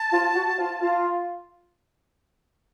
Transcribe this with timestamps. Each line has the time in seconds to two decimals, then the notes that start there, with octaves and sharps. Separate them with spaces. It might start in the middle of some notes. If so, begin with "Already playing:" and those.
Already playing: A5
0.12 F4
0.35 F#4
0.58 F4
0.81 F4